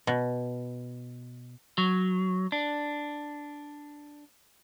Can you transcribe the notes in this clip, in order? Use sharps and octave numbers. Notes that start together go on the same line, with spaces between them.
B2
F#3
D4